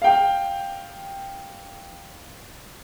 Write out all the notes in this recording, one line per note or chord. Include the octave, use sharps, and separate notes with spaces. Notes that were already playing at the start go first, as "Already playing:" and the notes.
F5 G5